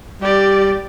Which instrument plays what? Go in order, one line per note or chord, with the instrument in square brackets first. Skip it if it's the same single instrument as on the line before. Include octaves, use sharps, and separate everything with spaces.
[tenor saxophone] G3 [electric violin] G4 D5